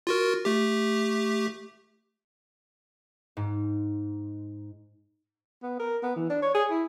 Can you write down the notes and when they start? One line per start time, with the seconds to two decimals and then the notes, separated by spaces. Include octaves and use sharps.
0.07 F4 F#4 A#4
0.45 A3 G4
3.37 G#2
5.62 B3
5.79 A#4
6.03 B3
6.16 E3
6.30 D4
6.42 C#5
6.54 G#4
6.71 E4